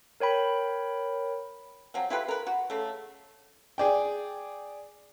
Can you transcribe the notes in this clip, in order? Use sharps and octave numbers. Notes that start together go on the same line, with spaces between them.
A#4 C#5 G5 B5
F3 F#3 C4
E4 F4 G4 B4
A#4 B4
F#4
C#3 A3
G#4 D5 G5